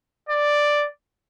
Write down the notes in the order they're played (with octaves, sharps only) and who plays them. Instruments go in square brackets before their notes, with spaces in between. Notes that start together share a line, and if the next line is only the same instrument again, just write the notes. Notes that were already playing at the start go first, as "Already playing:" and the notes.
[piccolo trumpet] D5